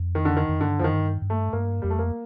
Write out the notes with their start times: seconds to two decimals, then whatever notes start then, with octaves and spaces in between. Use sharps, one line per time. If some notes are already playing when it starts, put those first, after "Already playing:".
Already playing: F2
0.15 D#3
0.25 D3
0.37 D#3
0.49 F2
0.60 G2 D3
0.79 F2 D#3 F3
0.91 G2
1.22 G2
1.30 A3
1.53 G2 A#3
1.82 F2 G3
1.90 A3
1.99 A#3